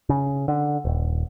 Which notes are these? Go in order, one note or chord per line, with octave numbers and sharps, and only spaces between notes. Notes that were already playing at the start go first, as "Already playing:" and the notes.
C#3
D3
D#1